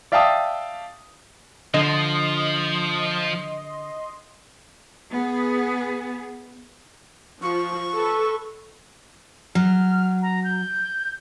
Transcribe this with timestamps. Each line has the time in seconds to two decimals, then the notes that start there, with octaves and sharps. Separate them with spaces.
0.12 D5 E5 F5 G5 A5 D#6
1.74 D3 F3 D#5 C6
5.11 B3 G#4
7.42 F3 C#6
7.93 A4 B4
9.55 F#3 F6
10.22 A#5
10.44 G6